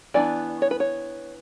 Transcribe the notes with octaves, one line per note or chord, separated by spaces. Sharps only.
E3 B3 D4 D5
C#5
B4
C#5